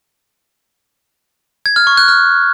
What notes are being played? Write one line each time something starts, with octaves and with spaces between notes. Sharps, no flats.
G#6
F6
C#6
F#6
F6